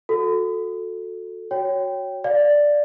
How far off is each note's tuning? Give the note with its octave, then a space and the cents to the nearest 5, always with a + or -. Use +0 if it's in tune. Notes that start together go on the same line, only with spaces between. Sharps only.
F#4 -30 A4 +0
F#4 +0 C#5 +0 G5 +0
D5 +0 F5 +15